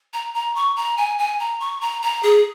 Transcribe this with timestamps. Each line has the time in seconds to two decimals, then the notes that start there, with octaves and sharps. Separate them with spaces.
0.13 A#5
0.34 A#5
0.55 C#6
0.76 A#5
0.97 G#5
1.19 G#5
1.39 A#5
1.60 C#6
1.81 A#5
2.02 A#5
2.23 G#4